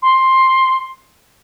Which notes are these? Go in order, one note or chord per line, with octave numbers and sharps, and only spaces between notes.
C6